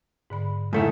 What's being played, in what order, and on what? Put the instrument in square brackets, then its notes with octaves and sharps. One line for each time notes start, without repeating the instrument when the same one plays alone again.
[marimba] G#2 D3 B5
[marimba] F2 C#3 E3 [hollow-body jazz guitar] G#2 A3 E4